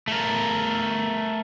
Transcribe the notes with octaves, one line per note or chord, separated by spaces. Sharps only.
A3 A#4